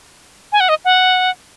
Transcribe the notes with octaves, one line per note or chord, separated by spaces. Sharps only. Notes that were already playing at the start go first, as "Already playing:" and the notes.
G#5
F#5
D#5
F#5